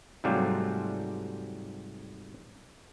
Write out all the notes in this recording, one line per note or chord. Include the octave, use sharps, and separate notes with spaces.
G#2 C3 F#3 G3 A3 F4